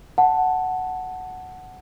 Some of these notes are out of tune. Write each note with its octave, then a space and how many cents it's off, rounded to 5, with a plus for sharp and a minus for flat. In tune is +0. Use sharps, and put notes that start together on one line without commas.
F#5 +0 A5 +0